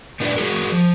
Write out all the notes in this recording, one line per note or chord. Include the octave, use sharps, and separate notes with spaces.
A#2 D4 D#4 G4 B4 D5
G#3 F#4 G#4 A#4
F3